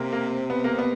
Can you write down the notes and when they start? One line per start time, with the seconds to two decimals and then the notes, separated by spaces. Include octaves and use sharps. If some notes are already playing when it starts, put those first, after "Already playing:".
Already playing: C3 A#3 C4
0.12 A#3
0.50 B3
0.64 A#3
0.79 B3